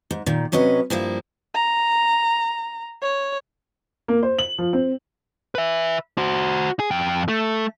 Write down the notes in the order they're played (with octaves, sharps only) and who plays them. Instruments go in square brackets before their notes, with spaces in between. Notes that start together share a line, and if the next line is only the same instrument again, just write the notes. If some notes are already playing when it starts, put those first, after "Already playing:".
[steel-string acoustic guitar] G#2
A#2 D#3
C3 F#3 C#4 B4 D#5
G2 F3 A#3 E4
[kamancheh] A#5
C#5
[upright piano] A#3
C5
F#7
F3
C4
[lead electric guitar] B4 E5
F#4 C5
G#4
F2 G5
A3